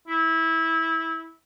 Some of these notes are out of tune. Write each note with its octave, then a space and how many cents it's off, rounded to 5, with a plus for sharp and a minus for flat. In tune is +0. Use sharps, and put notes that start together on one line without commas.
E4 -20